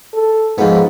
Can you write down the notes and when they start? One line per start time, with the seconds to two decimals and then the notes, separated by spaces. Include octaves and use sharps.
0.14 A4
0.58 G#2 F3 B3